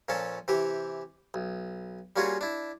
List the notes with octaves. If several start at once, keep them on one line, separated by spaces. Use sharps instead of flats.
A#2 F3 C#4 A4
C3 E3 G4
B1
G3 A#3 C#4 F4 F#4 G#4
D4 E4